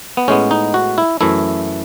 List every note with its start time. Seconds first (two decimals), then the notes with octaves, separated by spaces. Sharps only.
0.17 B3
0.28 A2 G#3 B3 C#4
0.51 D#4
0.74 F#4
0.98 E4
1.21 F#2 E3 A3 E4